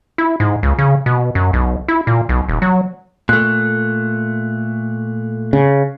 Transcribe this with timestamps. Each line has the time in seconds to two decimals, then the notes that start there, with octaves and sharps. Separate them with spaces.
0.18 E4
0.40 G#2
0.63 C#2
0.79 C#3
1.06 B2
1.35 F#2
1.53 B1
1.88 E4
2.07 A#2
2.29 B1
2.49 D#1
2.62 F#3
3.29 A#2 A3 F#6
5.53 C#3